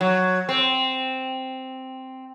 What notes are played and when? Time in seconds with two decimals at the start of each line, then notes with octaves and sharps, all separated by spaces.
0.01 F#3
0.49 C4